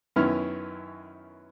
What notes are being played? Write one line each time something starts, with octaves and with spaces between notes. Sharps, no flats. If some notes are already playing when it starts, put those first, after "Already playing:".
F#2 D#3 B3 C#4 E4 F6